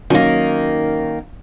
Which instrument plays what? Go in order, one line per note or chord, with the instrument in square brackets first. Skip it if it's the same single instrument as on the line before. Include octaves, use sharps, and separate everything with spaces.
[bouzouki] D#3 A#3 [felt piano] F#3 C#4